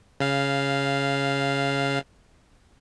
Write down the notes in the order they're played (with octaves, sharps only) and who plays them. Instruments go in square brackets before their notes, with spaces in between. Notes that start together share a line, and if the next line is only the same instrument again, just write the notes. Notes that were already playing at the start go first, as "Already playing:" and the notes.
[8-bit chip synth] C#3 F5